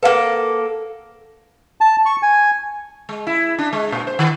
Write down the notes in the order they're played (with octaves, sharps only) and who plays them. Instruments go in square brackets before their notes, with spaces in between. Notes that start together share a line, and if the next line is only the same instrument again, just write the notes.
[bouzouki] A#3 A4 [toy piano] B4 F5 F#5
[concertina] A5
C#6
G#5
[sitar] G#3
E4
D4
G#3
A#2
C5
D#3